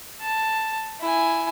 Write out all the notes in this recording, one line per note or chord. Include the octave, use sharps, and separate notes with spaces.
A5
E4 G#5